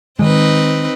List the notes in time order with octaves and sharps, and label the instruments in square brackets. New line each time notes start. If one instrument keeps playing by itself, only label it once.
[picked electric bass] D#3 G#3 [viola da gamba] C4 D#4 B4